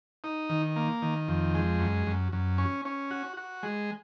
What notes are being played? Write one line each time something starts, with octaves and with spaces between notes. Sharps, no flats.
D#4
D#3
A#3
D#3
F2
G#3
F#2
F#2
F#2
C#4
C#4
F#4
F#4
G#3